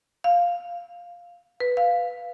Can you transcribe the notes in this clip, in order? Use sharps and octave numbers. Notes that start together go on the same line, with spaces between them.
F5
B4
F5